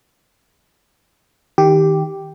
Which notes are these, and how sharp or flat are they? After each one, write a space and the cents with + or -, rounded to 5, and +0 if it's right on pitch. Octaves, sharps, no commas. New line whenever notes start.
D#3 +15 G4 +0